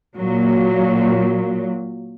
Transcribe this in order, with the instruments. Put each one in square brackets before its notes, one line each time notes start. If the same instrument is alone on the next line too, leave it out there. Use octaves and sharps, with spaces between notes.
[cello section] A#2 F#3